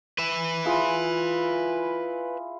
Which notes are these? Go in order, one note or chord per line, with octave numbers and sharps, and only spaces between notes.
B4 E5
E4 F4 G#4